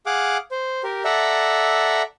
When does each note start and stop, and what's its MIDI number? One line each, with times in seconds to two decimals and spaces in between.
0.06 0.37 68
0.06 0.37 77
0.06 0.37 78
0.06 0.37 86
0.51 0.82 72
0.84 1.03 67
0.84 1.03 70
1.05 2.02 69
1.05 2.02 74
1.05 2.02 76
1.05 2.02 78
1.05 2.02 82